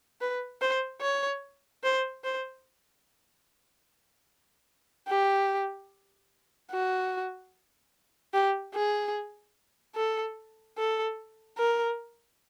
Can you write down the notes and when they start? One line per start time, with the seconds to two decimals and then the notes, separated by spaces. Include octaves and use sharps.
0.21 B4
0.61 C5
1.01 C#5
1.84 C5
2.24 C5
5.08 G4
6.72 F#4
8.34 G4
8.75 G#4
9.96 A4
10.78 A4
11.58 A#4